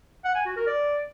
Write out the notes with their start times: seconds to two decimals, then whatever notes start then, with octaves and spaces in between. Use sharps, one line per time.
0.25 F#5
0.35 G#5
0.46 F#4
0.56 A#4
0.67 D5